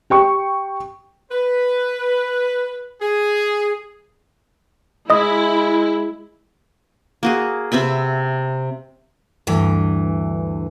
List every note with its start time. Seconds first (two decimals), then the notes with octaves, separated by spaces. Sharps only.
0.10 G4 G5 C#6
1.32 B4
3.02 G#4
5.10 G#3 E4 D#5 D#6
7.23 A#3 F#4 G#4
7.72 C3 C4 E5 B5
9.47 D2 G2 E3